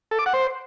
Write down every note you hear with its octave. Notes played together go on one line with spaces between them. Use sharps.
A4
D6
F#5
C5